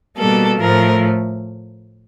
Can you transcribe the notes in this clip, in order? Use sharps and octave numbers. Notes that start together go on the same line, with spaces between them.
B2 G3 A#3 A4
A2 F3 A3 A#4